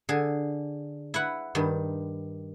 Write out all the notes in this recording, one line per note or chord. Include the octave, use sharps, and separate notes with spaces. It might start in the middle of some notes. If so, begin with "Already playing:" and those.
D3 G#4
E4 B4 F#5
G2 D#3